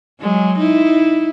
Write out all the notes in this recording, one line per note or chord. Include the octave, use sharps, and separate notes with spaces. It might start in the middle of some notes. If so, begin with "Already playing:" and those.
F#3 G#3
D#4 E4